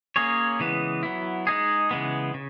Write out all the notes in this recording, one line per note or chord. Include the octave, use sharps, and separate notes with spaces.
A#3 C#4 G#4 C#5
C#3 E3 G#3 B3
F#3 B3 E4
G#3 D#4 G#4
C#3 E3 G#3 B3
C#3